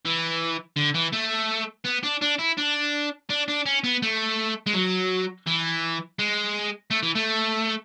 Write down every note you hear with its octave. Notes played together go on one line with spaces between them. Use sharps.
E3
D3
E3
A3
B3
D4
D4
E4
D4
D4
D4
C#4
B3
A3
G#3
F#3
E3
G#3
A3
E3
A3